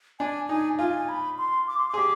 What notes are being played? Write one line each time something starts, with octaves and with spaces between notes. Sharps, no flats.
D4 G#5
D#4 G#5
F4 G#5
G#5
B5
C6
D6
C6
D6
G#4
G4